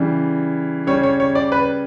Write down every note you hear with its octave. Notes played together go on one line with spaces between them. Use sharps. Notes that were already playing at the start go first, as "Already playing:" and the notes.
Already playing: C#3 E3 G3
C#3 G3 C#5
C#5
C#5
D5
B4